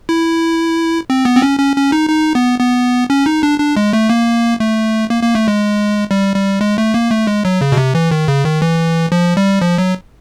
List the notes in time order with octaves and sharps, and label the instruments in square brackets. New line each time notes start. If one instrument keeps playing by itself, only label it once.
[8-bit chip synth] E4
C4
B3
C4
C#4
C#4
C#4
D#4
D#4
B3
B3
C#4
D#4
D4
D4
G#3
A3
A#3
A3
A#3
A#3
A3
G#3
G3
G3
G#3
A3
A#3
A3
G#3
F#3
C#3
B2
C3
E3
D#3
C#3
D#3
E3
F3
G3
F3
F#3